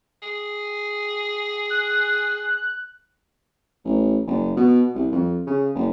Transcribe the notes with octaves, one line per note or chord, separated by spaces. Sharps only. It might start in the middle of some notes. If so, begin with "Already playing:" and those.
G#4
F#6
A1
F#1
B2
C2
F2
C#3
F#1